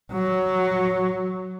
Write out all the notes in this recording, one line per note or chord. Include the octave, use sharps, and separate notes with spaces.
F#3